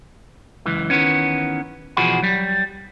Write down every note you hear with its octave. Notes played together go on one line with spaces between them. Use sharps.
C#2 F#2 E3
D#3 E3 B3 C#4
B2 E3 F3 F#4 G#4 B5
F#3 G3